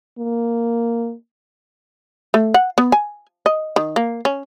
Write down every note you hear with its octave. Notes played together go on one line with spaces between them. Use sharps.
A#3
A3
F#5
B3
G#5
D#5
D#3
A#3
C#4